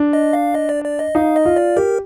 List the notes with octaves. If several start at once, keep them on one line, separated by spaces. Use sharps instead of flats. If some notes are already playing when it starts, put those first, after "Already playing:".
Already playing: D4
D#5
F5
D#5
D5
D5
D#5
D#4 F5
D#5
F4
D5
G4 A#4